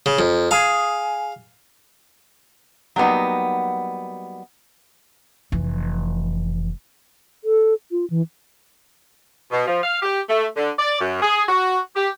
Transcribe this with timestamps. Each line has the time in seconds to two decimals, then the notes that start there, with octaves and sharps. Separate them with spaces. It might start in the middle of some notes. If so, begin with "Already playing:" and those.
0.06 C#3
0.19 F2
0.51 G#4 F5
2.96 F#3 G3 A#3 B3 D#4
5.52 F1 E3
7.44 A4
7.91 F4
8.10 E3
9.52 B2
9.67 F3
9.84 F5
10.02 G4
10.29 A3
10.57 D3
10.79 D5
11.00 F#2
11.22 G#4
11.48 F#4
11.96 G4